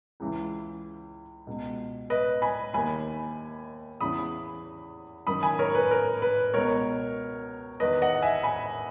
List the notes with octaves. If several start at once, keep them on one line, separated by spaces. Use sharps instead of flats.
C#2 C#3 E3
C#2 B2
B4 D#5
G#5 B5
D#2 D#3 G#5 B5
E2 C#3 E3 B5 D#6
F#2 D#3 B5 D#6
G#5 B5
A#4 C#5
B4
A#4
B4
C#2 B2 A#4 C#5
E2 D#3 B4 D#5
D#5 F#5
E5 G#5
G#5 B5